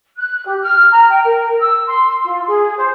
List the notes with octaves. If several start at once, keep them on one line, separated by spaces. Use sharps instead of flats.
F#6
G4
F6
A#5
G5
A#4
E6
C6
F4
G#4
C5